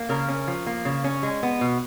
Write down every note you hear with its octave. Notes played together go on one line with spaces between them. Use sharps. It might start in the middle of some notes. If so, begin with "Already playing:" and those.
Already playing: A#3
C#3 A#4
C#4
F3
A#3
C#3
C#4
G#3
B3
B2